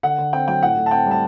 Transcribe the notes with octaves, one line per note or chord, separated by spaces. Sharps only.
D3 F#5
D3
C4 G5
F#3 G5
A2 F#5
A2
A5
C4 G5
G3
A5